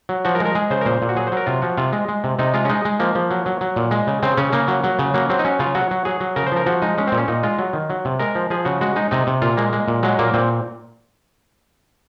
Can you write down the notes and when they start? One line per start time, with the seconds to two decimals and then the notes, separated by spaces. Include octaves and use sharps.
0.09 F#3
0.25 F3 F#4
0.35 A#4
0.40 G#3
0.45 A#4
0.55 G#3 G#4
0.70 C#3 C5
0.81 A#4
0.86 A#2 C5
1.02 A#2
1.09 F#4
1.16 F#3 G#4
1.27 C5
1.32 F#3 A#4
1.47 C3 F4
1.62 F3 F#4
1.77 C3 F4
1.93 G#3
2.08 G#3
2.24 C3
2.39 C3 D#4
2.54 G#3 F4
2.65 C#4
2.69 G#3 D#4
2.85 G#3
3.00 F3 A#3
3.15 F3
3.31 F#3
3.46 F#3
3.61 F#3
3.76 A#2
3.91 G#3
4.07 C#3
4.22 C#3 C4
4.37 C#3 C#4
4.53 C#3 A#3
4.68 F#3
4.84 F#3
4.99 C#3
5.14 F#3 A#3
5.30 F#3 C4
5.39 D#4
5.45 F#3 C#4
5.59 C#3 F4
5.75 F#3 F#4
5.91 F#3
6.05 F#3 G#4
6.20 F#3
6.36 C#3 A#4
6.47 C5
6.52 F3 A#4
6.66 F3 F#4
6.82 G#3 D#4
6.98 G#3 C#4
7.07 A#2 C4
7.18 C#4
7.28 A#2 D#4
7.43 G#3 F4
7.59 F#3
7.73 D#3
7.90 F#3
8.05 C3
8.19 G#3 A#4
8.35 F3
8.50 F3 G#4
8.65 C#3 F#4
8.81 G#3 F#4
8.96 G#3 D#4
9.11 C3 D#4
9.27 C3
9.42 A#2 F4
9.57 G#3 A#3
9.73 G#3
9.88 A#2
10.03 F#3 G#3
10.19 A#2 A#3
10.34 A#2 C4